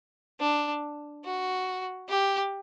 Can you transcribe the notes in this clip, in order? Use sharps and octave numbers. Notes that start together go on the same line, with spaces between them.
D4
F#4
G4